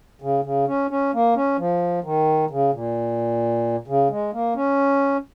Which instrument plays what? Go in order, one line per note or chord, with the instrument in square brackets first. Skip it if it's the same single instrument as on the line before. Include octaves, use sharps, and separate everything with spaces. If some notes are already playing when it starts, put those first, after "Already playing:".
[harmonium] C#3
C#3
C#4
C#4
A#3
C#4
F3
D#3
C#3
A#2
C#3
G#3
A#3
C#4